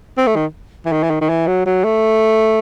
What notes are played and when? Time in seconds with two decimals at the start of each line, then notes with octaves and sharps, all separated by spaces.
0.18 C4
0.27 A3
0.36 D#3
0.86 E3
0.92 D#3
1.03 E3
1.10 D#3
1.21 D#3
1.29 E3
1.47 F#3
1.66 F#3
1.84 A3